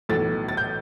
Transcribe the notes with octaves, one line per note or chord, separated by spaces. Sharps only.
B1 A2 E3 A3 A6
A6
G6